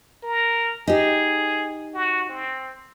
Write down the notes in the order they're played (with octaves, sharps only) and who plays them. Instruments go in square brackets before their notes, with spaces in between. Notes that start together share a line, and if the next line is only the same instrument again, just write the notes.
[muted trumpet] A#4
[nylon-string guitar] D#4 G4 [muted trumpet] G#4
[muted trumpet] F#4
C4